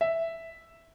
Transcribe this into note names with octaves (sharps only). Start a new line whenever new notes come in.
E5